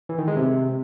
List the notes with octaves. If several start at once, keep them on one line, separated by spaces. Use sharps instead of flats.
E3
D#3
G#3
C3